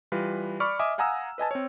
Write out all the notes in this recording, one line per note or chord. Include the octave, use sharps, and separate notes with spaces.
E3 G3 F4 B4
D5 B5 C#6 D6 F6
D#5 E5 G#5 D6 D#6
F5 F#5 G#5 A#5 D#6 E6
B4 D#5 G#5 A5
C4 C#5